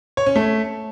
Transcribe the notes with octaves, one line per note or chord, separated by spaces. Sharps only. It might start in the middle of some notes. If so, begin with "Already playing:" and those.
C#5
C#4
A3